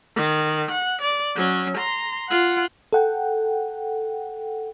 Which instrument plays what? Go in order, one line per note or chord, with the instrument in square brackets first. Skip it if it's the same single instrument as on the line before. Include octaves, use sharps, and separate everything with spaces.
[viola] D#3
F#5
D5
F#3 C#4
A#5 C6
F4 F#5
[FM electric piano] A4 F#5 G5